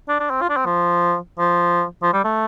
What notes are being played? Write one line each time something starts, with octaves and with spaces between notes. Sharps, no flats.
D4
D4
C4
F4
D4
C4
F3
F3
F3
G3
A3